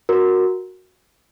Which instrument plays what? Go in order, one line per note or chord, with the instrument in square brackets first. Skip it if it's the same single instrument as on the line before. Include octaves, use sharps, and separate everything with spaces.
[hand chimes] F#4 A#4